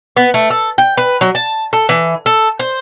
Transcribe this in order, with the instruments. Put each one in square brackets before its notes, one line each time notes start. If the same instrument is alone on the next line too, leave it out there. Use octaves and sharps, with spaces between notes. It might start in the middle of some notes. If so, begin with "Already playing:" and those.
[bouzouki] B3
A3
A4
G5
B4
F#3
A5
A4
E3
A4
C5